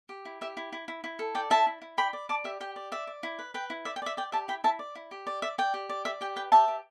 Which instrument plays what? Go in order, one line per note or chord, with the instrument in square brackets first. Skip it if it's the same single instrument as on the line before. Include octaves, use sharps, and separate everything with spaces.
[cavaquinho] G4
E4
G4 E5
E4
E4
E4
E4
A4
D5 G5
E4 E5 A5
E4
E4
D5 G5 B5
D5
D5 A5 D6
G4 E5
G4 G5
D5
D5 E5
D5
E4
B4
B4 G5
E4
D5 E5
G5
D5 E5
D5 G5
G4 E5 A5
E4 G5 B5
E4 E5 A5
D5
E4
G4
D5
D5 E5
D5 G5
G4
D5
D5 E5
G4 G5
B4 G5
G4 E5 A5
G4